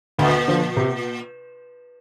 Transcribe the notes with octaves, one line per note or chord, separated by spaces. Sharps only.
D2 A#2
D3 F3
C3